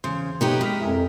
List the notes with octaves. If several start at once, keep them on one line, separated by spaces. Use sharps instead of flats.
E2 C#3 C5
B1 A3 B3 D#4 G4 C#5
G#3 B5 F6 B6
F2 E4 G#4 A#4